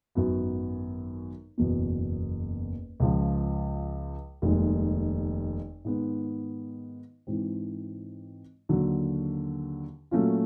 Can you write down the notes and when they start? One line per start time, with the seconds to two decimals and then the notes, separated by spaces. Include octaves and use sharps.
0.15 G#1 F#2 D#3 F#3 B3
1.58 F#1 E2 B2
3.00 C#2 C#3 F3
4.42 F1 D#2 D#3 G#3
5.85 G#2 D#3 G#3 B3
7.27 G#2 E3 G#3 C4
8.69 D#2 D3 F#3
10.11 A#2 F#3 A3 C#4 F4